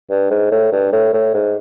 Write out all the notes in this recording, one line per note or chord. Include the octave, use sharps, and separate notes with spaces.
G2
G#2
A2
G2
A2
A2
G#2